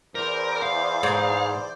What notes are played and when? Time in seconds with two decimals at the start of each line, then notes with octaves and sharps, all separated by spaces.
0.15 E2 A#4 C5 D5
0.62 F5
1.03 G#2